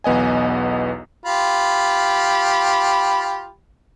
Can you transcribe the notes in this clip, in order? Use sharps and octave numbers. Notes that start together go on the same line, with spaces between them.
B1 E2 B3 D#5 G#5
F4 G4 B5